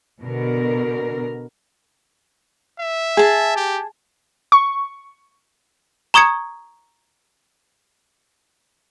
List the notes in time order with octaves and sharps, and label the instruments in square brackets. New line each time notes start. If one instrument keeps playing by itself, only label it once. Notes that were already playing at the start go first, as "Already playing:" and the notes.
[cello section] B2 D3 A#4
[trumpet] E5
[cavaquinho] G#4 A5
[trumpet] G4
[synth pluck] C#6
[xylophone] A#5 C#6 D#6 G#6 C#7